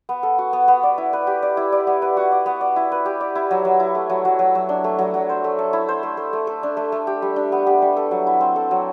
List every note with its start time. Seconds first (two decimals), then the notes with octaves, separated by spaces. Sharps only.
0.09 B3
0.23 A4
0.38 F#4
0.53 B3
0.68 B3
0.83 D5
0.98 E4
1.13 B4
1.27 G4
1.42 D5
1.57 E4
1.72 D5
1.87 B3
2.02 B4
2.17 F#4
2.32 D5
2.46 B3
2.61 D5
2.76 E4
2.92 B4
3.06 G4
3.21 D5
3.35 E4
3.51 F#3
3.65 F#3
3.80 E4
3.95 A3
4.10 F#3
4.25 F#3
4.39 F#3
4.55 F#3
4.69 D4
4.84 A3
4.99 F#3
5.14 F#3
5.29 C5
5.44 A3
5.59 A4
5.73 E4
5.88 C5
6.03 A3
6.17 A3
6.33 A3
6.47 A4
6.63 D4
6.77 A3
6.92 A3
7.07 G4
7.22 G3
7.36 D4
7.52 B3
7.67 G4
7.82 G3
7.97 A4
8.11 F#3
8.27 E4
8.41 C4
8.56 A4
8.71 F#3